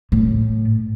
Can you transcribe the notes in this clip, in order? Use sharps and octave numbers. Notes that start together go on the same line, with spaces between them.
A2